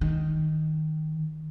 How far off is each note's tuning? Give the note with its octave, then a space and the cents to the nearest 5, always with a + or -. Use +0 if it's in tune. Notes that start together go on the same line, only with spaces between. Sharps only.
D#3 +0